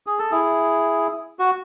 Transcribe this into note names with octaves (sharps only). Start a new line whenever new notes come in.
G#4
A4
E4 G#4
F#4